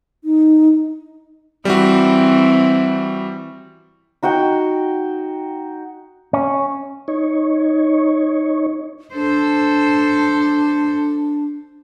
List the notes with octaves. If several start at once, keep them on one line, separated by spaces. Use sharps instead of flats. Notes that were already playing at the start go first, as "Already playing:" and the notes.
D#4
E3 G3 C4 F#4
D#4 F#4 F#5 G5
C#4
D#4 C#5
D4 A4 C5